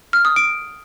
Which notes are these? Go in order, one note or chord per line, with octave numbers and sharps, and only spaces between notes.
F6
D#6
D7